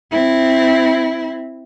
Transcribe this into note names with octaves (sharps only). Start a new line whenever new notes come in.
C4 E4